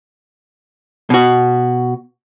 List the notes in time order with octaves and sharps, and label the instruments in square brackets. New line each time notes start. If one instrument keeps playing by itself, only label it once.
[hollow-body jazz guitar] B2 F#4